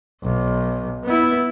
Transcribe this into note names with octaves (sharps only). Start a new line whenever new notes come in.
B1
B3 E4